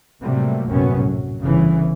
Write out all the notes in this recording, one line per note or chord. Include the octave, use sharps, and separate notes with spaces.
A2 C3 F#3 G3 A3 A#3
A#1 F#2 A2 C3 B3 C#4
F#3
G1 C#3 E3